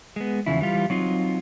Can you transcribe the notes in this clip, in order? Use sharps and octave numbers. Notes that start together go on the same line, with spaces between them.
G#3 B3
E2 C#3 F3 E4
E3 G3 F4
F#3 C4 D#4 F4